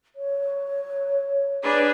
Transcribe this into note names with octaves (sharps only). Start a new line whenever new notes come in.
C#5
D4 G#4 B4